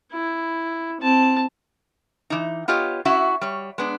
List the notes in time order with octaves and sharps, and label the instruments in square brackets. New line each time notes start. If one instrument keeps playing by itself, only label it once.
[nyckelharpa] E4
C4 A5
[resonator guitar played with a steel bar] E3 D#4
B3 F4 G4 C#5 D#5
C#4 E4 F#4 E5
G3 C#5
G#3 B3 D4